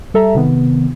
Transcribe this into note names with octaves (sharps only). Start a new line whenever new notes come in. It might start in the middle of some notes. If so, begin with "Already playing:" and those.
G3 A4 E5 A#5
C3 D#3 B3